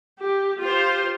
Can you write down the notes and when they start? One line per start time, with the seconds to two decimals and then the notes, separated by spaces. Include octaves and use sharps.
0.19 G4
0.61 F4 G4 C5